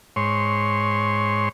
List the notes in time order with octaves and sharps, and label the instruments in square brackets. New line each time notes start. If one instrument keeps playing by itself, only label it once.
[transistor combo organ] G#2 C#5 C6